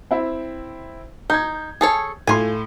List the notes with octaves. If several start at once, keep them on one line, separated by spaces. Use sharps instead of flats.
C4 E4
D#4 G6 G#6
G#4 A4 C#5
A2 A3 F4 G#5 C6